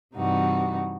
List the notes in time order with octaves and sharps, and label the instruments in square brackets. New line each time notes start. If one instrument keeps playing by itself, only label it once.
[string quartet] G2 C3 E3 G3 D#4 F#4